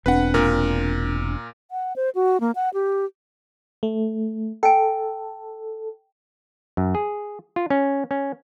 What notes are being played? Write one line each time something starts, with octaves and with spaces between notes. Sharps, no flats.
E1 C4 D4 B4 F#5
A#2 A#4
F#5
C5
F#4
A#3
F#5
G4
A3
A4 G5 G#5
F#2
G#4
F4
C#4
C#4